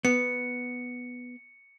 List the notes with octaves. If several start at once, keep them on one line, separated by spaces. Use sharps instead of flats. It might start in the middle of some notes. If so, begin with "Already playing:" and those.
B3 C#7